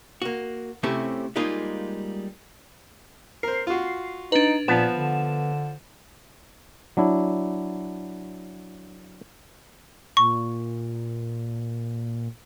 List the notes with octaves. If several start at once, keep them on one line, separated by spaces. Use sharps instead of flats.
A#3 F#4
C3 A3 C4 C#4 E4 G4
G3 G#3 A#3 D#4 F4 G#4
A#4 C5 C7
F4 F#4
D4 D#4 B4
A#2 F3 B3 A5 E7
D3
F#3 D4 E4
A#2 C#6